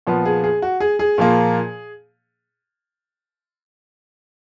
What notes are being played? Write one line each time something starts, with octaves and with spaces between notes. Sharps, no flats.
A#2 F3 B3
G#4
G#4
F#4
G#4
G#4
A#2 F3 A#3